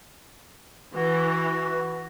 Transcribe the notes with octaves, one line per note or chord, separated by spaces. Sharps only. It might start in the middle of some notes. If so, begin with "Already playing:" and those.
E3 F#4